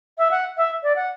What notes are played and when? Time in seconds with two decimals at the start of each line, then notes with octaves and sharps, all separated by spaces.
0.18 E5
0.31 F#5
0.57 E5
0.83 D5
0.96 F#5